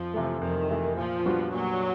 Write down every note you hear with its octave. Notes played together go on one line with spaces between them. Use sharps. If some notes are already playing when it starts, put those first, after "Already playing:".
Already playing: F2 F3
C3 E3 A3
F2 D#3
C3 E3 A3
A#2 F3
G3 B3 D4 F#4
A#2 F#3